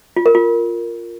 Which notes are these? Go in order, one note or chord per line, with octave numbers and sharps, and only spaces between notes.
F4
A#4
F4